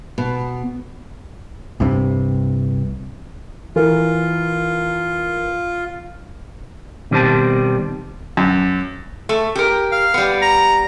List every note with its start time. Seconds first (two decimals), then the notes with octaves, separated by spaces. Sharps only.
0.18 B2
1.80 C2 G2 C3
3.76 E3 F4 A#4
7.11 B2 D#3 G3 C4 C5 A5
8.37 F#2
9.29 A3
9.55 G4 A#4
9.92 F5
10.14 G3 B3
10.42 A#5